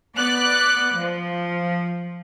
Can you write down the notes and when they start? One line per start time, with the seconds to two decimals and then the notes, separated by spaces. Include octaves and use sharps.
0.17 B3 D5 F#6
0.96 F3